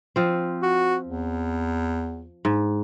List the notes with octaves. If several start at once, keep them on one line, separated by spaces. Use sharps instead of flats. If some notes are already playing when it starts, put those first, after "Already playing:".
F3 C4
F#4
E2
G#2